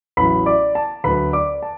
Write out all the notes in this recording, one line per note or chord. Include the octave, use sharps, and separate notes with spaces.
A1 A2 F#3 B4 B5
D5 D6
A5
D2 D3 F#3 B4 B5
D5 D6
A5